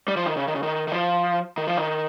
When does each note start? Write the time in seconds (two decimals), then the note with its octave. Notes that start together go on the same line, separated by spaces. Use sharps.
0.08 G3
0.17 F3
0.26 D#3
0.37 C#3
0.48 D#3
0.56 C#3
0.63 D#3
0.88 D#3
0.92 F3
1.58 D#3
1.67 F3
1.77 D#3